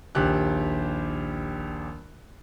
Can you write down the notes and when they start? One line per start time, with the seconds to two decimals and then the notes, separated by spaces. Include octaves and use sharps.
0.15 A#1 D#2 G4 F#6